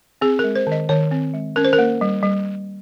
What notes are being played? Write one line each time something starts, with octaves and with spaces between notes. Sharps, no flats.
C4 G#4
G#3 A#4
C5
D#3 D#5
D#3 C#5
C4
G#3
C#4 A#4
C5
A#4
A#3
G3
G3